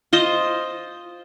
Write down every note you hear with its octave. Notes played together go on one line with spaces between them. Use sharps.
F4 C5 D#5